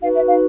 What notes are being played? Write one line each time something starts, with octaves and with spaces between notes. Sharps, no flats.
D#4 F#4 B4 F5
E5
F5